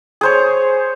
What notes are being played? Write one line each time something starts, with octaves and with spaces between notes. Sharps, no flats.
G#4 C5 C#5